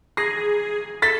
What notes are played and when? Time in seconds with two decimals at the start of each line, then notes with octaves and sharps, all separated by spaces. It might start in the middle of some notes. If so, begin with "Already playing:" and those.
0.17 G#4 A#6 C7
1.02 A4 A6 B6